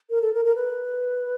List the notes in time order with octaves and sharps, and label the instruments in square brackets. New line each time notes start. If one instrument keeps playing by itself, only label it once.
[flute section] A#4
A4
A#4
A#4
B4